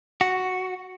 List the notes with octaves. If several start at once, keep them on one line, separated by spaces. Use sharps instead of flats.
F#4